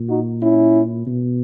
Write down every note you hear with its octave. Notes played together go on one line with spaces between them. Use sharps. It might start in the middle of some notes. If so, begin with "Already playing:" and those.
Already playing: A#2
D#4 F#4
C#4 E4
B2